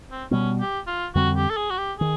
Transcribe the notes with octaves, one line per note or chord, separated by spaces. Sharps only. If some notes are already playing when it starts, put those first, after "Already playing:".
C4
B2 G3 B3 C#4
G4
F4
F2 D3 G3 C4 F#4
G4
A4
G#4
F#4
G4
D#3 G#4